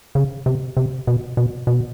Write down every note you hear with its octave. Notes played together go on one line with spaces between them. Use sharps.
C#3
C3
C3
B2
B2
B2